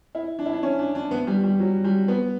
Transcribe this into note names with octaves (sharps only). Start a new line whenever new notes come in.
E4
D4
E4
D4
C#4
D4
D4
B3
G3
G3
F#3
G3
B3